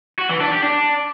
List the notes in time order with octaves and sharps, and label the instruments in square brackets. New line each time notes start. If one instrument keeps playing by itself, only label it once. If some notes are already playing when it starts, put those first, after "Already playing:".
[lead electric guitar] F#4
E3
D4
G4
D4